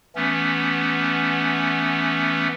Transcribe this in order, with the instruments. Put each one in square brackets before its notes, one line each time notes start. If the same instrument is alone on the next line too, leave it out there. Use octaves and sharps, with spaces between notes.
[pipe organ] E3 A3 B3 C#4